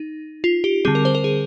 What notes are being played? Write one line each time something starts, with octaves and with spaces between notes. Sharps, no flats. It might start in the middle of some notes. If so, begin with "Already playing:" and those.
Already playing: D#4
F4
G4
D3 G3 C4 G#4
A#4
C5
A#4
G#4